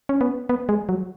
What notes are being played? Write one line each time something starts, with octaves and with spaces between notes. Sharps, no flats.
C#4
B3
B3
G#3
F#3